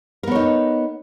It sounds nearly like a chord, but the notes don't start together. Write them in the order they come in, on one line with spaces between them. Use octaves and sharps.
A#4 B3 C#5 D#4